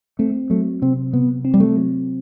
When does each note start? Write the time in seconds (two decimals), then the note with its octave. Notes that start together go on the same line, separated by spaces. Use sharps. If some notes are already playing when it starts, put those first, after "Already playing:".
0.19 A3 C4
0.50 F#3 A3
0.82 C3 C4
1.13 C3 B3
1.45 C4
1.54 G3
1.60 A3
1.76 F#3